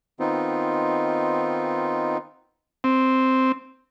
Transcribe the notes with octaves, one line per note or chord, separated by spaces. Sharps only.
D#3 B3 C4 D#4 F4
C4